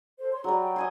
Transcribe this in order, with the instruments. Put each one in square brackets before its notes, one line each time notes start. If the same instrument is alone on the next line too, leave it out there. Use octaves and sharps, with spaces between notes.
[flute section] A4 C5
C#5 C6
[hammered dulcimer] F#3 G3 [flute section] G#4 A#5
[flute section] G5
[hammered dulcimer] D#5 G#5 C6